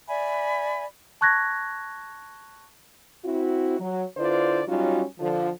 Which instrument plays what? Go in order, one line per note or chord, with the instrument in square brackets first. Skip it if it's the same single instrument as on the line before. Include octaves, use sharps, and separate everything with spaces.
[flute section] D5 E5 G#5 B5
[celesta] A5 C#6 F#6 G#6 A#6
[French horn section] C4 E4 F#4
F#3
D3 E4 F4 B4 C5 D5
F#3 G3 C#4 D#4 F4 F#4
D3 F3